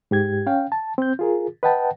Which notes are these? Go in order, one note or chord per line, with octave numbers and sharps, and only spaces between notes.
G#2 G4 G#6
C#4 F5 G5
A5
C4 G6
F4 G#4 A#4
B4 D#5 F#5 G5 A5